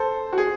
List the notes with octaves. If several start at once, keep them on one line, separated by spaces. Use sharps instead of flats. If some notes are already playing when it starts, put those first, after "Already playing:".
Already playing: A4 C5
F#4
G#4